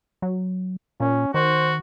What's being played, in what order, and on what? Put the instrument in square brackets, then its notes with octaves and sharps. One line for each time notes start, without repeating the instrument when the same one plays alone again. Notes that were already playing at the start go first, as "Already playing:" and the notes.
[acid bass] F#3
[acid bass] A#2 [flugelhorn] C#4
[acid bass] D#3 [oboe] F#4 [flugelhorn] C5